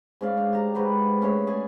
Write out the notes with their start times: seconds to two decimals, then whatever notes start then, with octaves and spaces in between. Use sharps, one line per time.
0.21 G#2 C#4 D5 F5
0.37 D4
0.53 G4 A#5
0.75 G#2 F#4 B4 G5
1.21 A3 C#4 G#4 C#5
1.47 G#4 D5 G#5